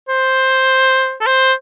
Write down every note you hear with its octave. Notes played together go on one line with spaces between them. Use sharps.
C5
A4
C5